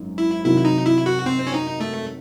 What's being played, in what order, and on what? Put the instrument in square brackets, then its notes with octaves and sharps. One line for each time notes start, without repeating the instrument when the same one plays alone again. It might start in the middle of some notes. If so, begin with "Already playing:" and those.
Already playing: [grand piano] G#1 F#2
[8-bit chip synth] E4
[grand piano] C3 D#3 F#3 [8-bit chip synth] E4
[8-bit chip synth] D#4
E4
F#4
C4
C#4
D#4
A3